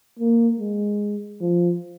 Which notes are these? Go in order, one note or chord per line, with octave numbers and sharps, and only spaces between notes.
A#3
G#3
F3